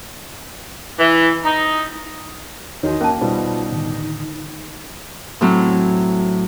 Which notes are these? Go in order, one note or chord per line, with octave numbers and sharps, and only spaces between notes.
E3
D#4
E2 D#3 D#4 F#4 C#5 D#5
A#3 C#4 A5
B2 G3 D#4 F4 B4 C5
A2 D3 D#3
A2 F#3 C4